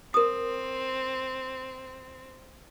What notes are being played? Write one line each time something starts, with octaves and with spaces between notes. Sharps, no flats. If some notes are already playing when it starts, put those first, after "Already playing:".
C4 A#4 D#6